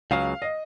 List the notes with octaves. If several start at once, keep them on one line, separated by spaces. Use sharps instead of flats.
C#2 C#3 F#3 F5
D#5